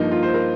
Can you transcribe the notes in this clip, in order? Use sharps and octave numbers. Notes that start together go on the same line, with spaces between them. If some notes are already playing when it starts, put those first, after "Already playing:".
Already playing: G2 F3 A#3 D#4
F4
C5
A#4